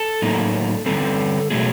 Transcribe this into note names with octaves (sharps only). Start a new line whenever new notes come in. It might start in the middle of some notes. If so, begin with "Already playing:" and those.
Already playing: A4
A2 F#3 A#3 D#4
D3 G3 C4 A4
B2 F#3 A3 G#4